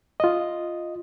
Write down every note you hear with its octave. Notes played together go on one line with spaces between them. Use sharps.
F4 D#5